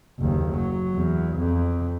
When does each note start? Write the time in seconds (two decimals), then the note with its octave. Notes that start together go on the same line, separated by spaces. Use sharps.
0.19 F#1 D#2
0.55 F#3
0.95 E2
1.37 F2